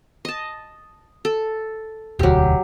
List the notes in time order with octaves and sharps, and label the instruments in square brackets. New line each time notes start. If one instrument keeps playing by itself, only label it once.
[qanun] D#5 A5
A4
[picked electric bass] E1 D2 [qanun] F#3 G4